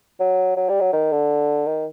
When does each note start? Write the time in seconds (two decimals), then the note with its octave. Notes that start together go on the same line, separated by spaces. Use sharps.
0.20 F#3
0.57 F#3
0.69 G3
0.81 F#3
0.93 D#3
1.12 D3
1.67 D#3